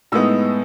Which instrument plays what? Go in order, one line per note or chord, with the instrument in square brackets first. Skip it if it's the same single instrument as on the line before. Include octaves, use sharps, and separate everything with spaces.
[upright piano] A2 G#3 B3 D#4 E6